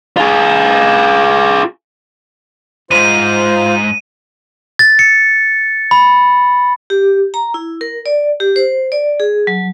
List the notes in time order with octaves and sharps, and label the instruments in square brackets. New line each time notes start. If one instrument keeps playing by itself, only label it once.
[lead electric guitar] F4 G#4
[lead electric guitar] E2 G#2 [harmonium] F4 C5 [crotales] D#7
[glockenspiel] A6
C#7
B5
[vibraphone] G4
A#5
E4
A#4
D5
G4
C5
D5
G#4
F#3